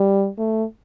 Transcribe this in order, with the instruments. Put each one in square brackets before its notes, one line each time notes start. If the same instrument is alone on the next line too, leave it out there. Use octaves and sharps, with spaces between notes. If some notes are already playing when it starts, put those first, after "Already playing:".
Already playing: [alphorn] G3
A3